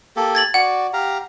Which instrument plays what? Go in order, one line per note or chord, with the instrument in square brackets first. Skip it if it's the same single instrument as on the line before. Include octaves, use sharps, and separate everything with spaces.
[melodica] A#3 G4 A4
[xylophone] G#6 A6 F#7
[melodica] F#4 D5 [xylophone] F#5
[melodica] G4 F5 A#5